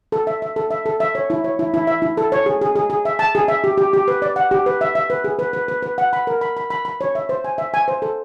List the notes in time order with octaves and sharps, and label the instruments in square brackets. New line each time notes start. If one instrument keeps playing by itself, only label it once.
[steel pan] A4
E5
E5
A4
E5
A4
E5
C#5
E4
C#5
E4
E4
E5
E4
A4
C#5
G#4
G#4
G#4
G#4
E5
A5
G#4
E5
G4
G4
G4
B4
D5
F#5
G4
B4
E5
E5
B4
G#4
B4
B4
B4
B4
F#5
B5
A#4
B5
B5
B5
B5
C#5
E5
C5
G#5
E5
G#5
C5
A4